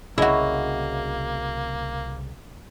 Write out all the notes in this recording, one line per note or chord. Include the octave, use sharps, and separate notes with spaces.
C2 C#3 A#3 E4 F#4 G#4 C#5 D#5